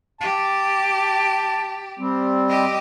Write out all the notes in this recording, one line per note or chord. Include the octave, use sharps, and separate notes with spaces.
G4 A5
G3 C4
G4 D#5